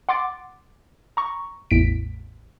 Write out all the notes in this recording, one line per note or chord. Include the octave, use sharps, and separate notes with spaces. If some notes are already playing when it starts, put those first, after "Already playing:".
F#5 C6 D6 A6
A#5 C#6
A1 E2 B6 D7